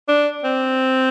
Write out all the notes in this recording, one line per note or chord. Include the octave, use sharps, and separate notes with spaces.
D4
C4